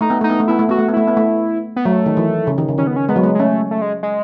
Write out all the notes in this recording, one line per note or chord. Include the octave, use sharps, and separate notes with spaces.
A3 D#4
B3
A3 D#4
B3
A3
B3 E4
A3
B3 F#4
A3
B3
A3 E4
B3
A3
B3
F#3 A3
D#3
E3
C#3
D#3
C#3
D#3 C#4
B3
C#4
G#3 B3
F#3
G#3
G#3
A3 C#4
A3
G#3
G#3